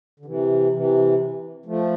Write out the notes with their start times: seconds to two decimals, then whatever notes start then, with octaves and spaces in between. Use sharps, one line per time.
0.20 D3
0.26 C3 E3
0.73 C3 E3
1.66 F3 A3